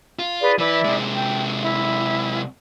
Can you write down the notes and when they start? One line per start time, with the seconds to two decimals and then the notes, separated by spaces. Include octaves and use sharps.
0.19 F4
0.41 G#4 B4 D5
0.59 E3 E4 B4 D5 E5
0.84 C3 G#3
1.14 G5
1.61 E4